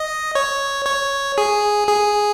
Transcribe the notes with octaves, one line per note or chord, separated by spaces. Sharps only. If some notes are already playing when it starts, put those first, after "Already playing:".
Already playing: D#5
C#5
C#5
G#4
G#4